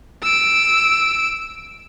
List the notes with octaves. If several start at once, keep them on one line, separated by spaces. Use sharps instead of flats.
E6 D7